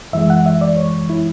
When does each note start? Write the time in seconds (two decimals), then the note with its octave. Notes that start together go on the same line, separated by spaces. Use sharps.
0.13 F#2 E3 G#3 E5
0.30 F#5
0.46 E5
0.61 D5
0.77 C#5
1.10 E4